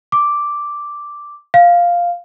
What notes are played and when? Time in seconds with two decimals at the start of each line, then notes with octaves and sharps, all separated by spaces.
0.12 D6
1.54 F5